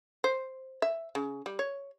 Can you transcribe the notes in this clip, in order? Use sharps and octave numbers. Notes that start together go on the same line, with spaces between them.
C5
E5
C#3
G3
C#5